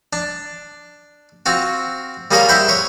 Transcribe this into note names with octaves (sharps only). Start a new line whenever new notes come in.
D4
C4 F4 F#4
G3 A#3 G#4 A#4 C#5 F5
E4 C5 F#5 G5 B5 C6
B4 C#5